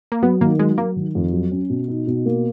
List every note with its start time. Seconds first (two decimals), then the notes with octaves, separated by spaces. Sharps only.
0.12 A#3
0.22 F#3 B3
0.41 D#3 A#3
0.59 F#3 G#3
0.78 F#3 A#3
0.96 D#3
1.15 F2
1.33 F#3
1.51 C#4
1.70 B2
1.88 D#4
2.07 B2
2.26 A#3